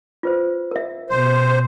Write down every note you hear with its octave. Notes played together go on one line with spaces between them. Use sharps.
F4 B4 C5
A#4 E5
B2 C5